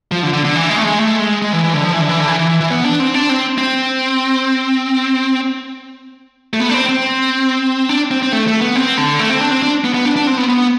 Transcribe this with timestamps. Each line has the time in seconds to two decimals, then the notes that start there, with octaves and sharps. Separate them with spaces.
0.11 F3
0.23 D3
0.33 D3
0.44 D3
0.55 E3
0.69 G#3
0.77 A3
0.84 G#3
0.99 A3
1.20 G#3
1.42 G#3
1.53 E3
1.64 E3
1.74 D3
1.84 F3
1.93 E3
2.01 D3
2.09 E3
2.20 D3
2.28 E3
2.39 E3
2.50 E3
2.60 E3
2.71 B3
2.85 D4
3.00 C4
3.14 D4
3.29 C4
3.58 C4
6.53 A3
6.60 B3
6.70 D4
6.74 C4
6.89 C4
7.89 D4
8.11 C4
8.22 C4
8.32 A3
8.47 A3
8.61 B3
8.76 C4
8.97 D3
9.19 A3
9.30 C4
9.40 D4
9.51 C4
9.62 D4
9.84 B3
9.94 B3
10.05 D4
10.16 D4
10.27 C4
10.37 B3
10.49 B3